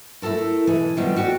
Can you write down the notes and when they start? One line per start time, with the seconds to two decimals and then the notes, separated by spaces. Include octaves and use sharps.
0.22 A3 E4 F4 A4 A#4
0.67 B2 E3 G#3 G#4 A4
0.97 D#3 F3 G3 A3 B3 C4
1.16 F#4 G4 A4 D5